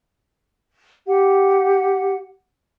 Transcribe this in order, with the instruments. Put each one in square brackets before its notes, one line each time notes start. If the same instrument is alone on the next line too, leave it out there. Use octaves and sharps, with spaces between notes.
[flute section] G4 F#5